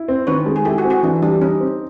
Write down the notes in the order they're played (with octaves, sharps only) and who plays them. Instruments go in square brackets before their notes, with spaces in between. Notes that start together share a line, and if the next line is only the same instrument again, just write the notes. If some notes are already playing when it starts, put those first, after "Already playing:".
Already playing: [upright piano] E4
C4
[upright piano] D#3 [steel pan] B4 C#5
[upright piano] G#3
[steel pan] G#4
[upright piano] E4 [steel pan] G4 A4
[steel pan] F#4 G#4
[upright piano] C4
[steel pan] F#4 G#4
[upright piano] E3 [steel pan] D4
[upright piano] G3 [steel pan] D4
[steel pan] C#4 [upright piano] D#4
[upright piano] C4